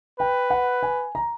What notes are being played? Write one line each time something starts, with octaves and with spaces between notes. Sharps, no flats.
B4 G5
F#5
G#5
A#5